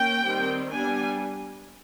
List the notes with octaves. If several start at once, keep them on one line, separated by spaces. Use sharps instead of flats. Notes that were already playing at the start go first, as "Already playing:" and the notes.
Already playing: A#3 C#4 G5
D#3 G3 C4
G3 B3 D4 G#5